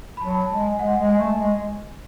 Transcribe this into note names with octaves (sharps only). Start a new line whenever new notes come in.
B5
F#3 A5
A5
G#3
G#5
G#3 F#5
G#3
G#5
A3
G#3